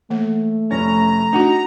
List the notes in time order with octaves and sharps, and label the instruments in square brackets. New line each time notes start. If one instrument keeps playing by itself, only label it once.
[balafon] E3 A#3 [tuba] A3
[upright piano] F1 C#4 [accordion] A#5
[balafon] D4 F#4 [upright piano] D#4 F#5